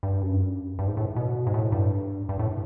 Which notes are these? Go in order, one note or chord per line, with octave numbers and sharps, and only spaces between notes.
G2
F#2
G2
F#2
G2
G#2
A2
B2
G#2
A2
G2
G2
A2